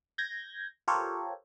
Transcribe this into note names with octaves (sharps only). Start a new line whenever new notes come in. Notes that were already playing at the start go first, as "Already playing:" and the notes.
G6 G#6 A#6
F4 G4 A4 A#4 C5 C#5